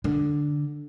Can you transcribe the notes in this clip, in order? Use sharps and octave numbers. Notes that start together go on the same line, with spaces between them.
D3